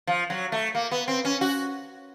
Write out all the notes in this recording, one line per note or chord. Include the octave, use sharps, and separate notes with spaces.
F3
F#3
A3
A#3
B3
C4
C#4
F#4